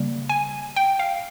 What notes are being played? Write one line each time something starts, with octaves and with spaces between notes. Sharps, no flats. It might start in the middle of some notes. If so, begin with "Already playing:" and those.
Already playing: C#3 G3 A#3
G#5
G5
F5